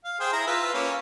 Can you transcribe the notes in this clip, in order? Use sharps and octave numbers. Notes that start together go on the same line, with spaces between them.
F5
G#4 C5 G5
E4 A#5
F4 B4 E6
A#3 C#4